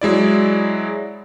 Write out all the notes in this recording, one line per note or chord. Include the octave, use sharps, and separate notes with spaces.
F#3 G#3 E4 D5